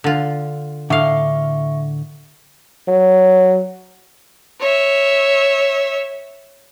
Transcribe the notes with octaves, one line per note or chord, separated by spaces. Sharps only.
D3 F4
A2 D3 E5 F5 C#6
F#3
C#5 E5